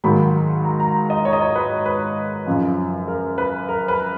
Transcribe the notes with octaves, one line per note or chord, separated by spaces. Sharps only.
G#2 D#3 F#3 A#3 B5
A#5
A#5
D#5
C#5
D#5
C#5
B4
B4
F#2 C#3 F3
A#4
B4
A#4
B4